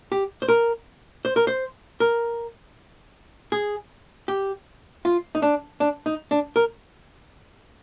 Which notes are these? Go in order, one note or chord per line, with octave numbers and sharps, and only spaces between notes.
G4
C5
A#4
C5
A#4
C5
A#4
G#4
G4
F4
D#4
D4
D4
D#4
D4
A#4